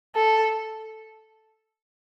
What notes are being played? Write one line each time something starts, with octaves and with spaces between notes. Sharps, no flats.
A4